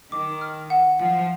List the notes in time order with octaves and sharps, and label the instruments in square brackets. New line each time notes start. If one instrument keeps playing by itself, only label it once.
[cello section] D#3 [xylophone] D6
[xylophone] F6
F#5
[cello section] F3 [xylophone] F#5